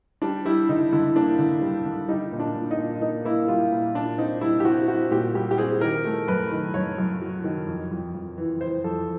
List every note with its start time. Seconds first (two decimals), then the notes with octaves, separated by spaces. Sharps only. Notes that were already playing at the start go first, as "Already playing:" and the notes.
0.22 G3 D4
0.45 G3 E4
0.69 D3 D#4
0.92 D3 E4
1.16 A#3 D4
1.39 D3
1.62 G3
1.85 D3
2.09 G3 D#4
2.32 A#2
2.40 D4
2.55 A#2
2.71 D#4
2.78 A#2
3.02 A#3 D#4
3.25 A#3 E4
3.48 G3 F4
3.72 A#2
3.95 A#2 D4
4.18 C4 D#4
4.41 G3 E4
4.60 G4
4.65 C4 F#4
4.88 C4 F#4
5.11 A#2 G4
5.35 G3 G4
5.51 G4
5.58 C4 G#4
5.81 D#3 A#4
6.05 A3
6.27 F#2 B4
6.51 D#3
6.74 F#2 C#5
6.98 F#2
7.21 F#3
7.44 D#3
7.67 F2
7.91 F2
8.15 F2
8.38 E3
8.61 E3 C5
8.84 F2 A4